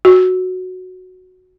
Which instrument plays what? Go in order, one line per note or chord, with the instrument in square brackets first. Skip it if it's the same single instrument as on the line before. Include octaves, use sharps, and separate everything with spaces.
[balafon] F#4